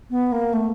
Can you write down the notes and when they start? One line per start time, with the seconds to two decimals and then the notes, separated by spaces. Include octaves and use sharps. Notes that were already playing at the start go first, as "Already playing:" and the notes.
0.10 B3
0.32 A#3
0.53 A3